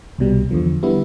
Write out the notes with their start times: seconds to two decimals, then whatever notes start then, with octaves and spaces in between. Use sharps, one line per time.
0.18 C2 B2 G3
0.51 E2 D3 F3
0.83 D3 G3 B3 E4